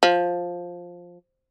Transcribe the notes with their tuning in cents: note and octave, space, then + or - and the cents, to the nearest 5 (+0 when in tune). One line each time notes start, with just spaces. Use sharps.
F3 +10